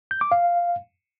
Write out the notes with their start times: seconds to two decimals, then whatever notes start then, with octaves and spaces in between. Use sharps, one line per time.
0.11 G6
0.21 D6
0.32 F5